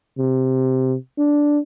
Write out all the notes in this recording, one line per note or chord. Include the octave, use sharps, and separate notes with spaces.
C3
D4